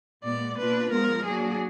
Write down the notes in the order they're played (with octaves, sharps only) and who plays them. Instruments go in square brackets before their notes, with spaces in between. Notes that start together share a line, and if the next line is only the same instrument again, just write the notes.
[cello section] A#2 G#3 B3 [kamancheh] D5
[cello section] B2 A#3 D4 F4 [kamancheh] B4
[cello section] F3 G#3 B3 [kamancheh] A#4
[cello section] F#3 A#3 D4 F#4 [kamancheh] G#4